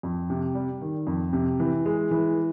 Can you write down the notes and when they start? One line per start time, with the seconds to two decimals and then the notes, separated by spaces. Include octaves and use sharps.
0.03 F2
0.30 C3
0.55 G3
0.81 D#3
1.07 F2
1.33 C3
1.60 E3
1.85 G#3
2.11 E3